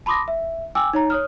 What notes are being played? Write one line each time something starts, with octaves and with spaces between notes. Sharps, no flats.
A5 B5 C6 D6 D#6 A#6
E5
G5 G#5 D6 E6
D#4 C#5 A#5
C#5 D#6 F6